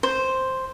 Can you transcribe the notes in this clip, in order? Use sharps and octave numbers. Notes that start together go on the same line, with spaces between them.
C5